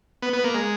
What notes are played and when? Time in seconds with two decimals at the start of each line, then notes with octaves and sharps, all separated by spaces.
0.22 B3
0.33 B3
0.44 A#3
0.54 G#3